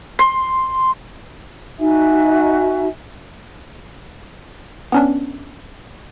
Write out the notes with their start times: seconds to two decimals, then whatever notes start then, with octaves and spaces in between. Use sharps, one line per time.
0.19 C6
1.80 D#4 F#4 E5 G#5
4.92 B3 C#4 D4